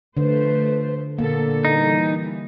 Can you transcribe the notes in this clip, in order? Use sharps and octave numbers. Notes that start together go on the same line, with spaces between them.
D3 F3 A3 B4 C5
A#2 D3 A#3 B3 A4
E3 G3 D#4